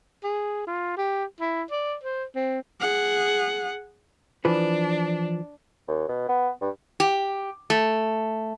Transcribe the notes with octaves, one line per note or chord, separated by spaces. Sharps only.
G#4
F4
G4
E4
D5
C5
C4
G#4 F#5
E3 F3 D4 B4
D#2
B2
B3
G2
G4
A3